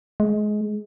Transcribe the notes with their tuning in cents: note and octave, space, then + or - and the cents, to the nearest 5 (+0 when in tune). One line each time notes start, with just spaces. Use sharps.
G#3 +20